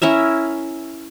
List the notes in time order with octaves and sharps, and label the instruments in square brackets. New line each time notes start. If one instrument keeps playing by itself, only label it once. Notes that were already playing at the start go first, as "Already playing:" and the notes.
[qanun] C#4 E4 A#4 E5